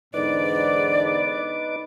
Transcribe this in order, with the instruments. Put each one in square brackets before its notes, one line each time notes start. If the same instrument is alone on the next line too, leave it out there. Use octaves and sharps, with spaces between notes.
[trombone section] E2 G#2 D3 [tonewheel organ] D#4 B4 D6 [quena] D5